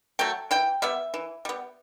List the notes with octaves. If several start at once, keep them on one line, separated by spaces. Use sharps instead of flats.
F#3 A3 G5
E3 G5
G3 B3 E5
E3
G3 B3